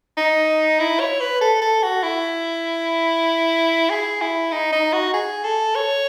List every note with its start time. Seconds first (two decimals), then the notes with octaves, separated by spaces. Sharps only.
0.17 D#4
0.80 E4
1.00 C#5
1.21 B4
1.41 A4
1.62 A4
1.83 F#4
2.03 E4
3.90 G#4
4.21 E4
4.52 D#4
4.73 D#4
4.93 F#4
5.14 G#4
5.44 A4
5.75 C#5